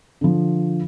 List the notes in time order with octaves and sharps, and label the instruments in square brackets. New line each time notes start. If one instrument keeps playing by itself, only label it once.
[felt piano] D3 F3